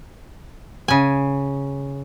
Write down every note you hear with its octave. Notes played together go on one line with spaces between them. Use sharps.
C#3 G#5